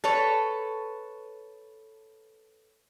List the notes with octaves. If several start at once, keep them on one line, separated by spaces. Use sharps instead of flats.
A4 B4 C#5